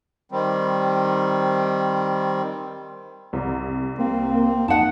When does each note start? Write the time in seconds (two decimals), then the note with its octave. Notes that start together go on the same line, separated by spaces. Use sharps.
0.32 D#3 G3 C4
3.33 C2
3.99 A#3 C4
4.68 F2 D#4 F#5 A5